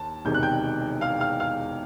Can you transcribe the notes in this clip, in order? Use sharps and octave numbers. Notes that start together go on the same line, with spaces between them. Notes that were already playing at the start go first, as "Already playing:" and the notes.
Already playing: D#2 A5
E1 E2 C3 D#3 G6
F#6
G5 G6
F5 F6
F5 F6
F5 F6